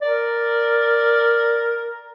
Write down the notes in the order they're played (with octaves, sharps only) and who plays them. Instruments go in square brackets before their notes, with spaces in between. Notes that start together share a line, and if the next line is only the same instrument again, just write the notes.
[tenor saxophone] A#4 [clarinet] D5